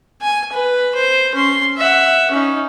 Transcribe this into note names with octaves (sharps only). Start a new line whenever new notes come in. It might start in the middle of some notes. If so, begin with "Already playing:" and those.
G#5
B4
C5
C#4 C6
E5 F#5
C#4 D#4